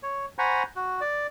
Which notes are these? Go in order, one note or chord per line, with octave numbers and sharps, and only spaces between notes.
C#5
C5 F#5 G#5 A#5 B5 C#6
F#4
D5